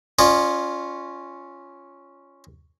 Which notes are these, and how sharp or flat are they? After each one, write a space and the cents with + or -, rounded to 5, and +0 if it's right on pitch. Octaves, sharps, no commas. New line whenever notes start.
C#4 +0 F4 +0 D5 +45